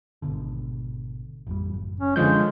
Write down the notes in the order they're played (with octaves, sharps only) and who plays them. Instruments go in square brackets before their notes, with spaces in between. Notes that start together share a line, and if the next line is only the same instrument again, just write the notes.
[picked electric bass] G#1 B2 D3
A1 F2 G3
F#1
[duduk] C#4
[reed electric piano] D3 F3 G6 [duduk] G#3